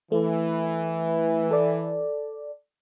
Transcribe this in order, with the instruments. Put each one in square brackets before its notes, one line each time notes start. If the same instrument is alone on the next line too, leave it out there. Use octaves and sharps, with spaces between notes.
[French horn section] E3 [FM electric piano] A3
[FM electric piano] A4 D5